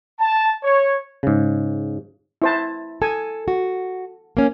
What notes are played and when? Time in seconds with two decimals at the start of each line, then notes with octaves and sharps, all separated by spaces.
0.20 A5
0.64 C#5
1.23 G#2 C#3
2.42 E4 C5 A5
3.02 A4 G#5
3.48 F#4
4.37 A#3 C#4